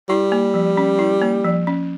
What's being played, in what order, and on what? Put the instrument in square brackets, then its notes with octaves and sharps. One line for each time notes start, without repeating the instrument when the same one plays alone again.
[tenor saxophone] G3 [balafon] E4
[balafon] A#3
F3
C#4
E4
A#3
F3
C#4